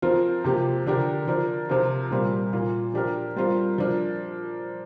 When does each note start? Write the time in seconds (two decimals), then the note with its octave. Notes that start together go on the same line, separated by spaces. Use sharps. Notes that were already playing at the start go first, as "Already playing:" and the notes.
0.02 F3 C4 F4 A#4
0.44 C3 F3 A#3 G4
0.87 D3 F3 D4 G4 A#4
1.28 F3 D4 A#4
1.69 C3 F3 C4 F4 A#4
2.11 A#2 G3 C4 F4 A#4
2.53 A#2 A#3 F4
2.94 F3 D4 G4 A#4
3.36 G3 C4 F4 A#4
3.78 F3 D4 A#4